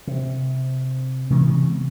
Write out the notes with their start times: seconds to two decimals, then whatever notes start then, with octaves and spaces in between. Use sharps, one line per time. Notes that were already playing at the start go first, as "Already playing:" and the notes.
0.07 C3
1.30 C3 E3 G#3 B3